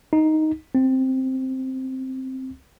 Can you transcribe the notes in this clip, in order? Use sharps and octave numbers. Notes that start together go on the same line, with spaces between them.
D#4
C4